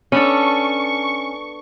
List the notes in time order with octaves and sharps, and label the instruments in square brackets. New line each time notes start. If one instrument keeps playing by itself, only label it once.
[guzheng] B3 D4 A4 [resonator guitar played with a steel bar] C#4 [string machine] C#6